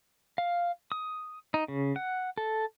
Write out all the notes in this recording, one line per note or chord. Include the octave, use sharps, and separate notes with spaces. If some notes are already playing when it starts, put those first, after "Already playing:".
F5
D#6
D#4
C#3
F#5
A4